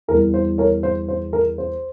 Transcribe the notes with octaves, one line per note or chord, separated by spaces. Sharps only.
E2 E3 G3 A#4
C5
A#4 C#5
C5
C5
A#4
C5